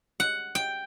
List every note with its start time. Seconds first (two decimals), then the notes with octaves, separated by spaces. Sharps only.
0.20 F#5
0.55 G5